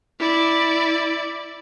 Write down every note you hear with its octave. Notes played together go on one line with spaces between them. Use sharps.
E4 D5